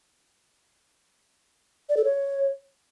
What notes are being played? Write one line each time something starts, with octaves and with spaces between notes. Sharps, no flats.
D5
A4
C#5